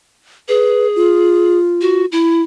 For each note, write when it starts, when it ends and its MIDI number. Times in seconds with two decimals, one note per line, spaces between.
0.48 1.58 68
0.48 0.87 71
0.96 2.04 65
1.81 2.05 66
2.12 2.42 64